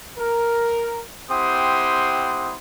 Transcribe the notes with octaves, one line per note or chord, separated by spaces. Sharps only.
A#4
C4 E4 G4 F#5 C6 D#6